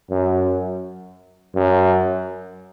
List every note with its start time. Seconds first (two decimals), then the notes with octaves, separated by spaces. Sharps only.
0.10 F#2
1.55 F#2